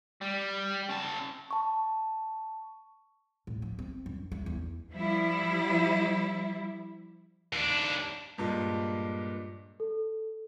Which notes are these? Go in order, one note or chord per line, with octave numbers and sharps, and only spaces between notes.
G3
C#3 A5
A5 C#6
A2
F3
C4
F#2
A3
E2
F3 G3 E4
D#2 D4
G2 A#2 G#3
A4